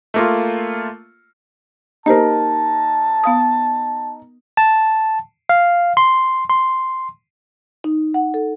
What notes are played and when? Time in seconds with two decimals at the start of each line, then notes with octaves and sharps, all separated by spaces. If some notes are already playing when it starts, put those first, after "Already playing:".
0.14 A3 A#3 F4
2.06 A#3 D#4 G4 A#4 C5 A5
3.24 B3 F5 D#6
4.57 A5
5.49 F5
5.97 C6
6.50 C6
7.84 D#4
8.14 F#5
8.34 A4